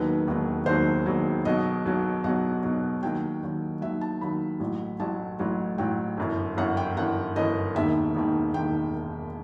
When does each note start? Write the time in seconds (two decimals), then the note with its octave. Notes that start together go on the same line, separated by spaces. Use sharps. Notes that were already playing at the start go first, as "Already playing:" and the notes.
Already playing: E1 D#2 D#3 F#3 B4
0.27 E1 D#2 D#3 F#3
0.66 E1 D#2 D#3 F#3 C5
1.06 E1 D#2 D#3 F#3
1.45 B1 B2 F#3 D#5
1.85 B1 B2 F#3
2.24 B1 B2 F#3 F#5
2.63 B1 B2 F#3
3.03 D#2 D#3 F#3 G5
3.43 D#2 D#3 F#3
3.81 D#2 D#3 F#3 E5
4.01 A5
4.21 D#2 D#3 F#3 B5
4.60 A1 A2 F#3
5.00 A1 A2 F#3 A5
5.39 A1 A2 F#3
5.78 A1 A2 F#3 G5
6.17 G1 F#2 E3
6.57 G1 F#2 E3 F#5
6.77 G5
6.97 G1 F#2 E3 F#5
7.36 G1 F#2 E3 D#5
7.75 E1 D#2 D#3 E5
8.15 E1 D#2 D#3
8.54 E1 D#2 D#3 G5